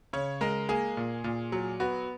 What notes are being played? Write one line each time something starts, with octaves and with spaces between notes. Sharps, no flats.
C#3 C#5
G#3 A#4
A#3 G#4
A#2
A#2
F#3
B3 F#4